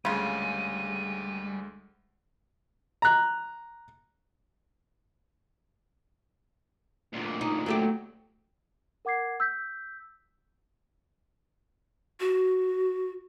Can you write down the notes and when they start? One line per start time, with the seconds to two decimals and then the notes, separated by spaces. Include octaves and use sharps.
0.05 D2 C#3 G3 G#3 F4 D#7
3.02 A#5 F#6
7.13 D2 A#2
7.41 D#4
7.66 F#3 A3 G4
9.05 A#4 F#5 D6 G#6 C7
9.40 E6 G6 B6
12.20 F#4